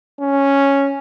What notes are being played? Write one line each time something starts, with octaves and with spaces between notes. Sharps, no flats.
C#4